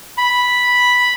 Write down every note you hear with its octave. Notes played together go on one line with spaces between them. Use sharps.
B5